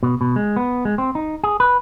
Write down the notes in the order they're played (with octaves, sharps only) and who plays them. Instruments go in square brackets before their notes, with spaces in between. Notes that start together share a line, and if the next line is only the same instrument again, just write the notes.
[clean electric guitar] B2
B2
G#3
B3
G#3
C4
D#4
G#4
B4